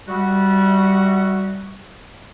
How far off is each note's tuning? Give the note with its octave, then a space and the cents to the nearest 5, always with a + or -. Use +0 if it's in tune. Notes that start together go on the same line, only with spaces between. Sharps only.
G3 -15 F#4 +0 E5 -35